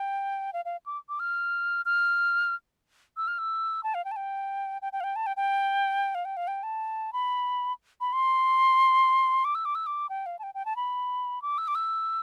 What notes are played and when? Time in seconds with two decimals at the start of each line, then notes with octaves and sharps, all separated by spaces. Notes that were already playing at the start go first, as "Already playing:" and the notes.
Already playing: G5
0.53 F5
0.65 F5
0.86 D6
1.09 D6
1.19 F6
1.85 F6
3.17 E6
3.27 F6
3.38 E6
3.83 A5
3.94 F5
4.05 G5
4.11 A5
4.16 G5
4.82 G5
4.92 G5
5.00 F5
5.03 G5
5.16 A5
5.26 G5
5.36 G5
6.15 F5
6.25 G5
6.37 F5
6.47 G5
6.63 A5
7.13 B5
8.01 B5
8.13 C6
9.44 D6
9.55 E6
9.65 D6
9.75 E6
9.86 D6
10.09 G5
10.26 F5
10.39 A5
10.43 G5
10.54 G5
10.65 A5
10.76 B5
11.42 D6
11.58 E6
11.67 D6
11.75 E6